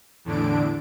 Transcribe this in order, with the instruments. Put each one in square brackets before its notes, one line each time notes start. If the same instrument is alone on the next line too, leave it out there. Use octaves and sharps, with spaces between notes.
[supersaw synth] E2 A2 D3 D4 D7